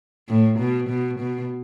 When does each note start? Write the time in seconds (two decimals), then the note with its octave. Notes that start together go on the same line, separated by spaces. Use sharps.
0.29 A2
0.59 B2
0.89 B2
1.20 B2